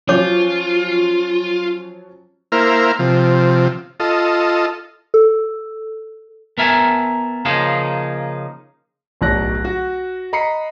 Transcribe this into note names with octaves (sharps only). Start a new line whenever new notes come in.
F3 F#3 C#4 F4 C#5 D6
A#3 E4 A#4 C5 F5
C3 F3
F4 A4 D#5
A4
B3 A#4 E5 G#5 A5
C#3 F3 A#3 D#4 G#4
D1 B1 F#3 D5 F#6 A#6
F#4
D#5 A#5 B5 C7 C#7